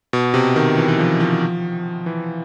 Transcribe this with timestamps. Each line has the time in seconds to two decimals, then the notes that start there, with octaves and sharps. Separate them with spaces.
0.13 B2
0.34 C3
0.56 D#3
0.77 E3
0.88 E3
0.98 F3
1.20 F3
2.06 E3